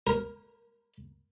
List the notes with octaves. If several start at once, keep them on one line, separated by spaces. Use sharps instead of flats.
A#4